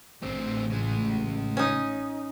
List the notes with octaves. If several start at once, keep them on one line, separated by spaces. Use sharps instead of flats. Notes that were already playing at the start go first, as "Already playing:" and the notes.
A1 D3 C4
C#3 G#3
C#4 D#4